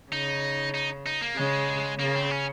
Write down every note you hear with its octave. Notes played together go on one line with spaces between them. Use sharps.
C#3 D#4
D#4
D#4
A#3
C#3 G#3
C#3 A#3
C4
C#4